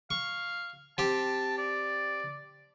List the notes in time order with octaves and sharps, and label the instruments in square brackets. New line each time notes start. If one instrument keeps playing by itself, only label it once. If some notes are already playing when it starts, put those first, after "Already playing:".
[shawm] F5 [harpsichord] C#6
[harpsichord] C4 G4 [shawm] A5
[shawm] D5